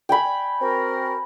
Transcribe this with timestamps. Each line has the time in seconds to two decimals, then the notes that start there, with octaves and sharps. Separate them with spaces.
0.09 G5 G#5 B5
0.61 C4 F#4 A#4